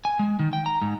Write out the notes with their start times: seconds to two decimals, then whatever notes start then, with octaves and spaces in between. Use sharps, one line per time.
0.05 G#5
0.19 G#3
0.39 D#3
0.53 G5
0.66 A#5
0.82 G#2